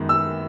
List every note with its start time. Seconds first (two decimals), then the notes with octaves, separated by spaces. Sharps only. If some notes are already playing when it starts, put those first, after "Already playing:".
Already playing: F#2 D#3 G#3 B3 D#4
0.09 E6